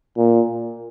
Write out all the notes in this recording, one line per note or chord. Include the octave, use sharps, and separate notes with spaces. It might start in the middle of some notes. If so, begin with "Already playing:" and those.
A#2